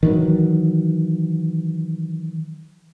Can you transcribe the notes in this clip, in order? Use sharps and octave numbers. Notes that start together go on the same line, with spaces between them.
D#3 E3 F#3